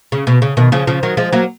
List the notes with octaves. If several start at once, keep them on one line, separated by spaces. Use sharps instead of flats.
C#3
B2
C#3
B2 D#3
C#3 F3
C#3 F3
D#3 F#3
F3 G#3
F#3 A#3